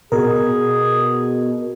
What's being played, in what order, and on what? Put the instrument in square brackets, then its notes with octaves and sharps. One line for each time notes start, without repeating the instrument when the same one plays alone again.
[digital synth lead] B2 [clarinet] G#4 [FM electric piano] A#4